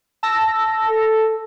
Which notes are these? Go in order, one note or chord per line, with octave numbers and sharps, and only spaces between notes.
A5 E6 A#6
A4